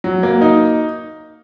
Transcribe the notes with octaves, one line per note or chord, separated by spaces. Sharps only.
F#3
A#3
D#4